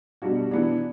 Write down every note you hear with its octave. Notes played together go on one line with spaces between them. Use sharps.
B2 G3 D4 F#4
E3 B3 D4